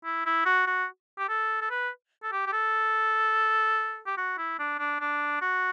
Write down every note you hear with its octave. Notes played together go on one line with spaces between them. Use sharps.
E4
E4
F#4
F#4
G4
A4
A4
B4
A4
G4
G4
A4
G4
F#4
E4
D4
D4
D4
F#4